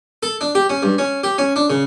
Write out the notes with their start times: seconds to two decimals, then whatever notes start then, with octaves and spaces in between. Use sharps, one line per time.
0.23 A4
0.41 D4
0.55 G4
0.70 C#4
0.83 G2
0.98 C#4
1.23 G4
1.38 C#4
1.56 D4
1.70 C#3